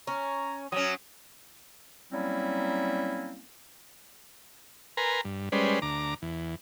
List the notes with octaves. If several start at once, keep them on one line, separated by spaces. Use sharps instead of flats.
C#4 A#5
F#3 C#4 D#6
F#3 G3 A#3 C4 C#4 E4
A#4 B4 G#5 A#5 C6
G2
G3 G#3 C#4 B4 C5 D5
D2 A#5 D6
E2